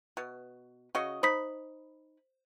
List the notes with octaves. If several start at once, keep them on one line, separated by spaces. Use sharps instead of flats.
B2
C#3 F#4 D#5
D#4 C5 B5 D#6 B6